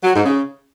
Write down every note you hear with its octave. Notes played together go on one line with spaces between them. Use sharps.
F#3
G#2
C#3